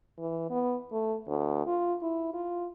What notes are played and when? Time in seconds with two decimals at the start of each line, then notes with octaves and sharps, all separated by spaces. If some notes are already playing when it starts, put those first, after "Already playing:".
0.18 E3
0.50 B3
0.92 A3
1.27 D2
1.67 F4
2.02 E4
2.33 F4